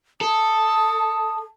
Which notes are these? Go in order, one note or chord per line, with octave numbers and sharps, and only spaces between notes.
A4 D#6